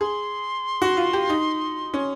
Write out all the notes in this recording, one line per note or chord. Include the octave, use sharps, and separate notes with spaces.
G#4 C6
F#4
F4
G4
D#4
C#4